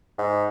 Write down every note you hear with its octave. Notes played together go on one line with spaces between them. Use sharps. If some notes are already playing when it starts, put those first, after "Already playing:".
G#2